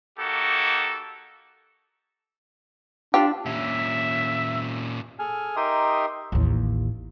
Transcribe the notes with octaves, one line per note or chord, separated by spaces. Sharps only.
A#3 D#4 F#4 G4 A4
D4 F4 G4
A#2 C#4 E5
G#4 A4 G#5 F6
D#4 G4 A#4 E5 C6 D#6
A1 D#2